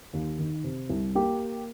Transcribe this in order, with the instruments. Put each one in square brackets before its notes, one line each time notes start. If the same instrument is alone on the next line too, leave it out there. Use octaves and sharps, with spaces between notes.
[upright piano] D#2
D#3
C3
C2
A#3 G4